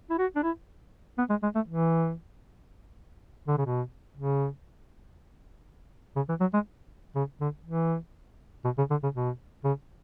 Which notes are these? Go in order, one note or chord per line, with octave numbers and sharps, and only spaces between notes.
E4
F#4
D4
E4
B3
G#3
G#3
A3
E3
D3
C#3
B2
C#3
C#3
E3
F#3
G#3
C#3
D3
E3
B2
C#3
D3
C#3
B2
C#3